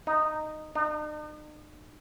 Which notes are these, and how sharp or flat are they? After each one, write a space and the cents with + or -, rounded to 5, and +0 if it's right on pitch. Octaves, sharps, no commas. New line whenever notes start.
D#4 -10
D#4 -45